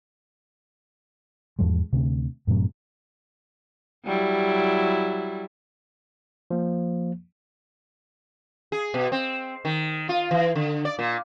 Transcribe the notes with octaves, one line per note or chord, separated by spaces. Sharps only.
E2 G#2 F3 G#3
D2 C3
F#2 A2 C3 F#3
F#3 G3 E4
F3 A#3
G#4
B2
C4
D#3
F4
E3
D3
D5
A#2